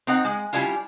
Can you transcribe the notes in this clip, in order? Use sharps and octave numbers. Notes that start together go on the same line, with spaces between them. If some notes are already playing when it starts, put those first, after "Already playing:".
C4 D#4 F#5
G#3
G3 C#4 D4 E4 F4